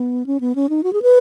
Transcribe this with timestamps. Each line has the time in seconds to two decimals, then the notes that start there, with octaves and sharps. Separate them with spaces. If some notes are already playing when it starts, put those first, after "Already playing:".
Already playing: B3
0.26 C#4
0.40 B3
0.55 C#4
0.69 D#4
0.83 F#4
0.93 G#4
1.02 B4